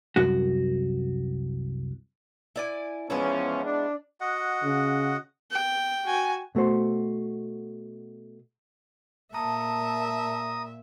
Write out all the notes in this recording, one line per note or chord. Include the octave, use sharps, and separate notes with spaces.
C2 F#2 F#4
E4 D5 G#5
E2 F3 G#3 B3 C#4 E4
D4
F#4 D#5 F#5
C#3
G5
F#4 G#5
B2 A3 F#4 C5
A#2 E5 A5 A#5 D#6